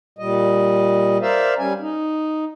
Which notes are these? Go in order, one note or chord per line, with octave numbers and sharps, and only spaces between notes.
A#2 G3 D#5
A#4 C5 D5 E5 F5
G3 C#4 G#5
D#4